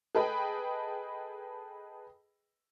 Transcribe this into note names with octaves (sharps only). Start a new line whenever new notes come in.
G#4 A4 B4 D#5 G5 B5